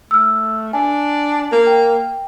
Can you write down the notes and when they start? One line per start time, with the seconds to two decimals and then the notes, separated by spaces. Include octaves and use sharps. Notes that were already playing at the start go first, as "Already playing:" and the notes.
0.11 A3 E6 F6
0.73 D4 G#5
1.52 A#3
1.67 G5